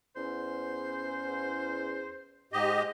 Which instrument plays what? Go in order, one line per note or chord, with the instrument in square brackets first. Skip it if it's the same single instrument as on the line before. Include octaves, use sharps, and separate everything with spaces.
[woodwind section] E2 C#4 [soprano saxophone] C5
[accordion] G#2 G4 D#5